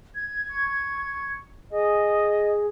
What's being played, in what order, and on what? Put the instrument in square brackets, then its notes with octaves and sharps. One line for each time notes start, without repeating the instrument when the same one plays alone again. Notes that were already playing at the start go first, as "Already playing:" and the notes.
[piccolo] G#6
[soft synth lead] C#6
[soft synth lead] G#4 [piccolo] D#5